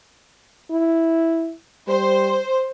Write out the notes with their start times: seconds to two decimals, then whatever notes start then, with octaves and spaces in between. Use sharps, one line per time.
0.71 E4
1.88 G3 C5